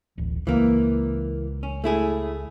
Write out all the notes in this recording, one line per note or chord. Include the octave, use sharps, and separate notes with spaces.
D1 A1
C#2 E3 A#3
C#4
A3 E4 G#4